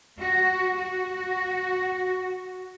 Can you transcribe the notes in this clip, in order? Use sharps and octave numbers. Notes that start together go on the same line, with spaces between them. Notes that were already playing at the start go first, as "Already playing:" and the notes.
F#4
F#4